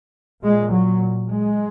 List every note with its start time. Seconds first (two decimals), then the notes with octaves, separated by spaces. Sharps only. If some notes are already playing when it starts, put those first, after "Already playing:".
0.42 A#2 G#3
0.72 F#3
1.29 G#3